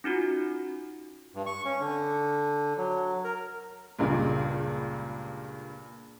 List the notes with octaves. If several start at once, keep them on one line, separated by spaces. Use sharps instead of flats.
C#4 D#4 F4 F#4
G2
C#6
C#4
D3
F#3
A#4
C#2 G2 A#2